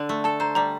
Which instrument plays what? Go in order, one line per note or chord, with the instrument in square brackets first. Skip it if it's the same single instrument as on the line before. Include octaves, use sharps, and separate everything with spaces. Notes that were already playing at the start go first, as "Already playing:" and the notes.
Already playing: [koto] D3 D4
A3
[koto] A4 [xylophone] A5
[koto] C5 [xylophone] A#5
[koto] G3 [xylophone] A#5